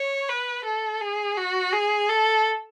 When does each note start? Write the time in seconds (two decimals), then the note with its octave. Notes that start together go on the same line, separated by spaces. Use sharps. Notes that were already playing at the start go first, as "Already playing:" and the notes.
Already playing: C#5
0.29 B4
0.65 A4
1.01 G#4
1.37 F#4
1.73 G#4
2.09 A4